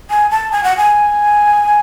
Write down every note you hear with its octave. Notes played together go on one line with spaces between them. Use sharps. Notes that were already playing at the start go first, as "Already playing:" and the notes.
G#5
A5
G#5
F#5
G#5